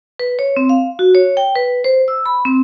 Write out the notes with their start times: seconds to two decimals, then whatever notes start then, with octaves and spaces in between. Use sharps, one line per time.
0.19 B4
0.39 C#5
0.57 C4
0.69 F5
0.99 F#4
1.15 C#5
1.37 G5
1.56 B4
1.84 C5
2.08 E6
2.26 B5
2.45 C4